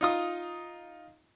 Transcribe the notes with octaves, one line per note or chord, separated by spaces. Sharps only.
D#4 F4 D#6